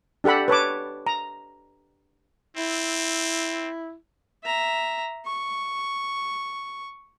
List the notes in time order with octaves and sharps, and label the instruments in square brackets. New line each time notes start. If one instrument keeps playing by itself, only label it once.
[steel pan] D4 G4 A4 F#5 B5
B4 C#5 A5 D6
A#5
[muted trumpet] C4 [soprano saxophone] E4
[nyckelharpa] E5 A#5
C#6